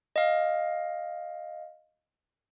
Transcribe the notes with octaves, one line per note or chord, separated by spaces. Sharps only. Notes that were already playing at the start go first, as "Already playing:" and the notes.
D#5 F5